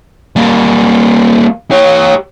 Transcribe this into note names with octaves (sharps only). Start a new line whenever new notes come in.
G3 A#3
G4 C#5